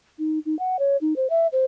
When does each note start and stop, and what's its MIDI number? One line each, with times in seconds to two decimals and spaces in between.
0.19 0.39 63
0.45 0.57 63
0.59 0.77 78
0.79 0.97 73
1.01 1.14 63
1.16 1.27 72
1.30 1.47 76
1.52 1.65 72